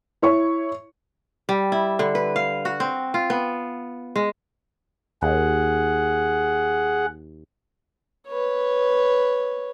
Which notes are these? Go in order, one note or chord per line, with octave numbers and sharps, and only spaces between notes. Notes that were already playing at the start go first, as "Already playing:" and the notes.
E4 C#5 C#6
G3
E4
D3
B4
F5
F#4
C4
F4
B3
G#3
D#2 G#4 F#5
B4 C#5